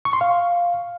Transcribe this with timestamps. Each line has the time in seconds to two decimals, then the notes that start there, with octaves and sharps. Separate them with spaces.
0.05 C#6
0.13 C6
0.21 F5